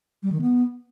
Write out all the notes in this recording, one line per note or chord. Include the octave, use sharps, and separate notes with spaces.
G3
D#3
B3